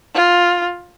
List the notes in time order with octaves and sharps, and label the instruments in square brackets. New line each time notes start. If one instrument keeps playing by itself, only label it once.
[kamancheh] F4